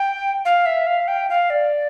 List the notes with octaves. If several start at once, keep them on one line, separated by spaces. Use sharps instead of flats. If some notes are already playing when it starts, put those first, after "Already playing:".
Already playing: G5
F5
E5
F5
G5
F5
D5